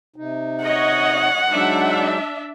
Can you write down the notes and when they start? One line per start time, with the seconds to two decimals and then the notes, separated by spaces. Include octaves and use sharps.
0.16 C3 D#4
0.64 C#5 D#5 F#5
1.51 F#3 G#3 D4 D#4 E5